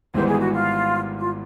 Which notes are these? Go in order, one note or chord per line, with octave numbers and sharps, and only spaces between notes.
G#1 G#2 E3 G3 B3 C5
G#4
F#4
F4
F4